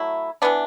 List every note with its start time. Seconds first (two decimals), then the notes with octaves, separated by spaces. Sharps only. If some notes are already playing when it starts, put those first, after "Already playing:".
Already playing: F#3 A3 E4
0.42 E3 B3 D4